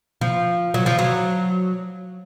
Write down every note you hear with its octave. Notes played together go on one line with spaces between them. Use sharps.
F3
F#3
F3
F#3